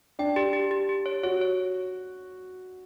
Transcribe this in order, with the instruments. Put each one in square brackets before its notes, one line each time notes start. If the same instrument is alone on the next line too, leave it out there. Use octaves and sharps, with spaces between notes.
[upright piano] D4 [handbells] G5
[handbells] G4
G4
G4
G4
C#5
[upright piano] F#4 [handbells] C#5
[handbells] C#5